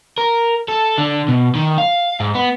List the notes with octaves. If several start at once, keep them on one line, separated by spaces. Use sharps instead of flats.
A#4
A4
D3
B2
D#3
F5
G#2
B3